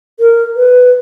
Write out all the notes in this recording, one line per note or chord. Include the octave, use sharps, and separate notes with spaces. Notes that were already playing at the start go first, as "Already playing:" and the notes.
A#4
B4